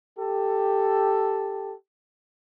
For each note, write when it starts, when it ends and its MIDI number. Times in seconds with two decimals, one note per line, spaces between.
0.18 1.74 67
0.18 1.74 69